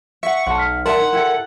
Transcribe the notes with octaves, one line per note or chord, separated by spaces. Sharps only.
E5 F#5 C#6
B1 F#5 A5 C6
F6 B6
A#4 D5 E5 F#5 A5 C6
D4 D#4
E4 G4 A4